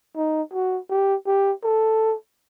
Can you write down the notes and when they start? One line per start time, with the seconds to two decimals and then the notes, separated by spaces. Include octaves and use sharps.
0.16 D#4
0.53 F#4
0.90 G4
1.27 G4
1.64 A4